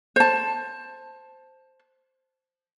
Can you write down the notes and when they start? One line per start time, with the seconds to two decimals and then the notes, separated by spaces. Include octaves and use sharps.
0.16 C5 A5